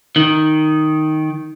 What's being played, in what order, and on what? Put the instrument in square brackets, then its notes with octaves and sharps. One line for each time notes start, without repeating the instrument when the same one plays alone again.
[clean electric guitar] D#3